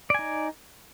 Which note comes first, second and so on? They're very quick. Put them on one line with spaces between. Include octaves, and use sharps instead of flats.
D5 G#5 D#4